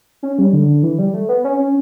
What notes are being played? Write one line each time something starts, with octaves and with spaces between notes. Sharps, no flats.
C#4
G3
D3
E3
G3
A3
B3
C#4
C#4